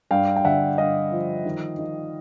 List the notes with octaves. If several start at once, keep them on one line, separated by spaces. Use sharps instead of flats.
G2 F5 G5
G5
D3 E5 F#5
G2 D#5 F5
F3
D#3
D#3